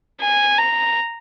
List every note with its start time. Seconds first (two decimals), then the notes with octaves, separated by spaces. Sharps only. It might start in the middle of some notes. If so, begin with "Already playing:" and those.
0.21 G#5
0.58 A#5